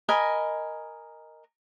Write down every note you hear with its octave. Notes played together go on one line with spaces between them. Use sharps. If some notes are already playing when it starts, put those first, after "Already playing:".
A#4 D#5 G#5 B5